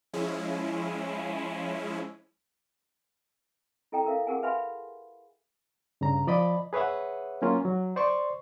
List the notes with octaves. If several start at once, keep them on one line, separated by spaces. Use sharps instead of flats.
F3 G#3 C#4 E4
E4 A4 D#5 G5 A#5
A4 A#4 E5 F5
G4 G#4 A#4 F#5 G#5
B4 E5 F5 G#5 B5 C6
G2 C#3 A#5
F3 D5 D#5 B5
G#4 B4 C#5 E5 F#5
F#3 A#3 C#4 F4
F#3
C5 D5 C6 C#6